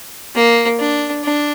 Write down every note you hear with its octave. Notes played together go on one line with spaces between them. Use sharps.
A#3
D4
D4